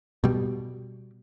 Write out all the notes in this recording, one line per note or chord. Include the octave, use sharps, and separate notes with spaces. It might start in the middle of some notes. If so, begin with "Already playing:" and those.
B2 G3